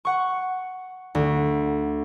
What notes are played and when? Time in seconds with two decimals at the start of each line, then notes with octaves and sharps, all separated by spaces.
0.05 F#5 C#6
1.15 D2